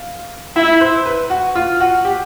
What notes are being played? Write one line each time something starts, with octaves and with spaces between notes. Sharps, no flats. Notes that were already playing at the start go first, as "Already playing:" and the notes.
Already playing: F5
E4 E5
C5
B4
F#4
F4
F#4
G4